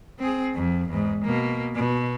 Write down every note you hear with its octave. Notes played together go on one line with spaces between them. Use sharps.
C4 G#4
F2
E2 G#2
B2 A#3
B2